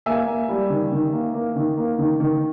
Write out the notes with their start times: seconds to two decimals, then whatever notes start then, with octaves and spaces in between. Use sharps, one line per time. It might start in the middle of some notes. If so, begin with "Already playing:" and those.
0.06 A#3 E5 G#5
0.27 A#3
0.49 G3
0.70 D#3
0.92 D#3
1.12 A#3
1.34 A#3
1.56 D#3
1.77 A#3
1.98 D#3
2.20 D#3